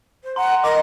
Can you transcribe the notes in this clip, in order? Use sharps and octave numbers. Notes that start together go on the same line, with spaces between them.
C5
F#5 A#5 C6
A#4 D#5 D6